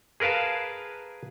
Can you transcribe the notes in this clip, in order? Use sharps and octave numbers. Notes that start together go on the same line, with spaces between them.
G#4 A#4 B4 F5 A5